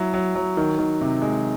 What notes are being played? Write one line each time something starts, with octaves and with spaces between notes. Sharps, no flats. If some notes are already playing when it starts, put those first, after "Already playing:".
Already playing: F#3 E4
F#3
F#3
D#3
D#3
C3
G#3